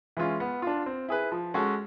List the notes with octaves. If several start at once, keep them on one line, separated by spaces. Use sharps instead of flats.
E3 G#3 C#4 F4
B3
D4 F4
C4
E4 G#4 B4
F3
G#3 C#4 F#4 A4